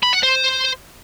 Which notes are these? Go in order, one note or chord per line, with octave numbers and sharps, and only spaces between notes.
B5
F#5
C5